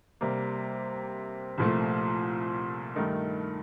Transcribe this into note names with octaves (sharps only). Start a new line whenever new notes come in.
C3 G3 A#3
C2 A#2 F3 A3
G2 D#3 A3 D#4 A#4